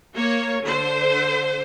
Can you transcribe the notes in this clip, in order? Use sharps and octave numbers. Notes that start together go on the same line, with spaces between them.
A#3 C#5
D3 C5